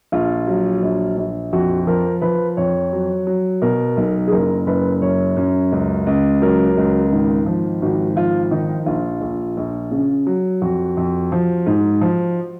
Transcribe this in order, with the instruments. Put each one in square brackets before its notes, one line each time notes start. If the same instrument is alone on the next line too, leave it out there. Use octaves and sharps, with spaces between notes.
[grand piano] A#1 F4
F#3
A#1
A#1
F2 F#4
F3 A#4
F3 B4
F2 C#5
F#3
F#3
B2 A#4
B1
G#4
F#1 A#4
F#1 B4
F#2 C#5
F#2
C#2
C#2
F#3 A#4
C#2
G#1
F3
G#1 F#4
F3 F4
D#3 D#4
A#1 F4
A#1
A#1
C#3
F#3
F2 F#4
F2
F3
G#2
F3